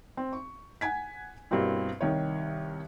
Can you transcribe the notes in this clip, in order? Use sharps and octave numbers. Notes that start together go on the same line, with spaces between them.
C4
C#6
F#5 G#5 G#6 B6
G2 B2 A#3 C4 E4
C2 D#3 C#5